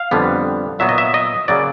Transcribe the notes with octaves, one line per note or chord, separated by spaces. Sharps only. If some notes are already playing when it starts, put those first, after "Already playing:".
Already playing: F5
F2 D3 G3 B3
A#2 F#3 B3 E5
D#5
E5
D#5
C#3 F#3 A#3 D5